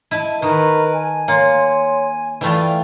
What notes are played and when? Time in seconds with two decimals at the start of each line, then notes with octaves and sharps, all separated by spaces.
0.11 E4 D#5 A5
0.42 D#3 A#4 B4
0.95 G#5
1.28 A#3 C#5 C6
2.41 E3 A3 F4 D5 G5 B5